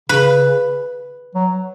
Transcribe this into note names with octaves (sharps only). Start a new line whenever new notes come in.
C#3 B4
F#3